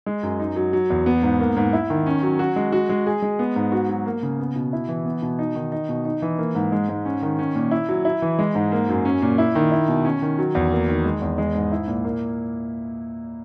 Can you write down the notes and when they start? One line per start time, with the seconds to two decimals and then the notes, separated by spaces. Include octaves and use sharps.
0.06 G#3
0.23 F#2
0.40 D#4
0.56 F#3
0.73 F#3
0.90 E2
1.06 B3
1.23 G#2
1.40 A#3
1.57 G#2
1.73 E4
1.90 D#3
2.06 C#4
2.23 F#3
2.39 F#4
2.56 G#3
2.72 F#4
2.89 G#3
3.06 G#4
3.22 G#3
3.39 B3
3.56 G#2
3.72 F#4
3.89 F#3
4.06 A#3
4.23 C#3
4.39 B3
4.56 B2
4.73 E4
4.89 E3
5.05 B3
5.22 B2
5.39 D#4
5.55 D#3
5.72 D#4
5.89 B2
6.05 D#4
6.22 E3
6.38 A#3
6.55 G#2
6.72 G#3
6.89 G#2
7.05 C#4
7.22 D#3
7.39 C#4
7.55 A#2
7.71 E4
7.89 F#3
8.05 E4
8.22 E3
8.39 G#3
8.55 G#2
8.72 A#3
8.89 F#2
9.05 C#4
9.22 A#2
9.38 E4
9.55 D#3
9.72 E4
9.88 B2
10.05 C#4
10.22 D#3
10.39 F#3
10.55 E2
10.71 A#3
10.88 D#3
11.05 G#3
11.22 E2
11.38 G#3
11.55 G#2
11.72 E4
11.88 A#2
12.04 A#3